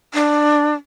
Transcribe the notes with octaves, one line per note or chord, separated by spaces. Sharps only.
D4